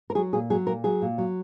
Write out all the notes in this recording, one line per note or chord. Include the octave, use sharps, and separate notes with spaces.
A#4
F#3 G#4
A#2 G#4
F#3 G#4
A#2 A#4
F#3 G#4
A#2
F#3